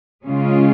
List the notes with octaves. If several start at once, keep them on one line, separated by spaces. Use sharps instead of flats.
C#3 G#3 C#4 F4